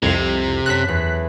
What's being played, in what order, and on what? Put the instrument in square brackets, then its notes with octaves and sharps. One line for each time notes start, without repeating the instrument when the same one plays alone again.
[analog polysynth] C2 F2 [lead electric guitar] C3 [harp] G#6 C7
[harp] F#2 A4 A#6 [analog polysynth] F#6 B6
[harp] E2